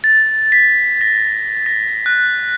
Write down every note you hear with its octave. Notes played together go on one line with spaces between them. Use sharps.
A6
B6
A#6
A#6
F#6